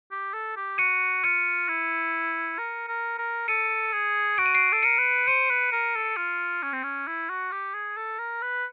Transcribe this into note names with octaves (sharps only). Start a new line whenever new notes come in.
G4
A4
G4
F#4 C#7 D#7
F4 C#7 D#7
E4
A#4
A#4
A#4
A4 C#7 D#7
G#4
F#4 D7
D#7
C7 D7
A4
A#4 C#7 D#7
B4
C5 C#7 D#7
B4
A#4
A4
F4
C#4
C4
C#4
E4
F#4
G4
G#4
A4
A#4
B4